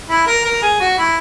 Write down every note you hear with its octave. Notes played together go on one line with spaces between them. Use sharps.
E4
A#4
A#4
G#4
F#4
E4